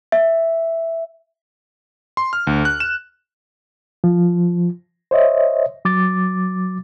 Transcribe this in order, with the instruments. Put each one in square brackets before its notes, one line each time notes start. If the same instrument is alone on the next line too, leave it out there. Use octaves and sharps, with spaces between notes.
[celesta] E5
[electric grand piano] C6
F6
D2
F#6
E7
[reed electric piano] F3
C5 C#5 D#5 E5
F#3 D6 A6